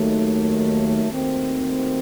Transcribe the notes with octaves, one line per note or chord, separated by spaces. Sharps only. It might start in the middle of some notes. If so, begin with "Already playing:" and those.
Already playing: D#2 D#3 F#3 A3
D#2 D#3 A3 C4 F#4